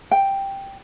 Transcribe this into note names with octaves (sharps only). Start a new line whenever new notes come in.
G5